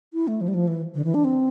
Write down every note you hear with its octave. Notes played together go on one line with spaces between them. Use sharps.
E4
A3
F3
G3
F3
E3
D3
E3
D4
C4